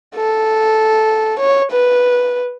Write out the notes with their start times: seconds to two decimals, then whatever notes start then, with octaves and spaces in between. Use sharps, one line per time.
0.15 A4
1.39 C#5
1.71 B4